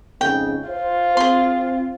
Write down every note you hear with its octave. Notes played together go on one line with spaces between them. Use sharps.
F2 G#2 C#3 G5
F4 C5
C4 G#4 C6